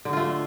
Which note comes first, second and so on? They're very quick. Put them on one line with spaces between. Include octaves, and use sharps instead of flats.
D3 C4 F4 A3